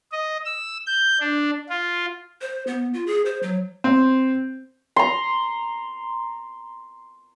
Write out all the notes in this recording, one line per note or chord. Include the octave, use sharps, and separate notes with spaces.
D#5
E6
G6
D4
F4
C5
B3
F4
G#4
C5
F#3
C4
A#5 C6